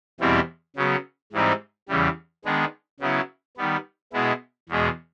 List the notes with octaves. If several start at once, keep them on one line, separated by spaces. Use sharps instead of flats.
E2 B2 G3 C4 E4
C#3 F#3 B3
G#2 E3 G3 C4 D#4
E2 C#3 E3 G3
D#3 G#3 B3 D4
C#3 F#3 B3 E4
D#3 G3 B3
B2 G#3 B3 E4
E2 B2 G#3